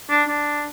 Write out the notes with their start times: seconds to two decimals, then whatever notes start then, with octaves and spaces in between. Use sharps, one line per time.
0.10 D4
0.28 D4